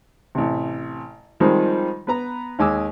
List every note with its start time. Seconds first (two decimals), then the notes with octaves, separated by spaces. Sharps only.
0.35 A1 C3
1.40 D#3 F3 G3 G#3 C4 D#4
2.07 B3 B4 A#5
2.59 D#2 G#3 G#5 D6 E6